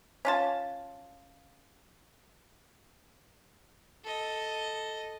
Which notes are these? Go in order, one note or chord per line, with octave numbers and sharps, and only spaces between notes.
C#4 F4 A5
A4 D#5